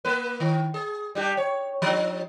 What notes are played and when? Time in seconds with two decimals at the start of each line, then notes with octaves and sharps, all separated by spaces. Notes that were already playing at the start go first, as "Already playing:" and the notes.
0.05 A#3 B4
0.40 D#3
0.74 G#4
1.15 G3 D4 G4
1.37 C#5
1.82 F3 D4